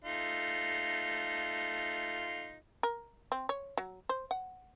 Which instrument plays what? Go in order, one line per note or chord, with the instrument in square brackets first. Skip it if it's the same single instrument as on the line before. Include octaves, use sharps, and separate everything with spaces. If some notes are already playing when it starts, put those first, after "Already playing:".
[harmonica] A3 D#4 F4
[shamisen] A#4
C4
C#5
F#3
C5
F#5